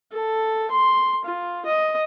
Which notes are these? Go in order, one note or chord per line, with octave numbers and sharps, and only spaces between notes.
A4
C6
F4
D#5